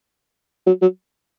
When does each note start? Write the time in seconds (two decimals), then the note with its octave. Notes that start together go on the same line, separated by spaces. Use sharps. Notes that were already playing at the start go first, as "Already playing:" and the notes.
0.67 F#3
0.82 F#3